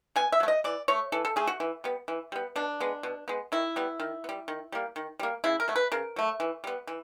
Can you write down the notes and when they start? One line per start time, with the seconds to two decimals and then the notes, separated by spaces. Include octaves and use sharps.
0.16 B2 G#5
0.32 E5
0.40 F#3 A3
0.48 D#5
0.64 E3 D5
0.88 A3 C#5
1.12 E3 A4
1.25 A4
1.36 A3 G#4
1.47 F#4
1.60 E3
1.84 G3 B3
2.08 E3
2.32 G3 B3
2.56 B2 D4
2.80 G#3 B3
3.03 B2
3.28 G#3 B3
3.52 D#3 E4
3.76 G3 B3
4.00 D#3
4.24 B3
4.29 G3
4.48 D#3
4.72 G3 A#3
4.96 D#3
5.19 G3 A#3
5.44 C#3 E4
5.60 A#4
5.68 F#3 A3
5.76 B4
5.92 C#3 A#4
6.16 F#3 A3
6.40 E3
6.64 G3 B3
6.87 E3